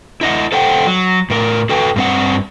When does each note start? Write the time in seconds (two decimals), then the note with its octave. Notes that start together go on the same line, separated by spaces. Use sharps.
0.21 E4 D#5 F#5
0.52 A4 C5 F#5 G5
0.87 F#3
1.30 A2 A#4
1.69 F#4 A4 B4 G5
1.96 G2 C4 F#5